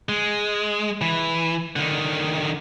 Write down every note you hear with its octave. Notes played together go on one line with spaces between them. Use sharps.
G#3
E3
D3 D#3